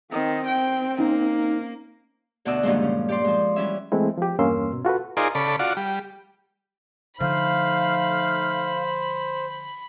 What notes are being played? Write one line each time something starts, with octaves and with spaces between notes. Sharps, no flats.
D#3 C4
G5
A#3 C#4 D#4
D2 B2 D5 E6
G2 A#2 D3 D#3 F3 G#3
C#4
G4 D5 C6
F3 G#3
E3 G3 C#4 E5
E3 G#3 A3 C4 E4
F3 G4
E2 G2 A#3 C#4 C6 E6
B2
F4 F#4 A4 B4
D#4 F4 G#4 A#4 C5 D5
C#3 A4 D5 B5
F4 F#4 D5
G3
D3 F3 A3 D#4 C5 F5 B5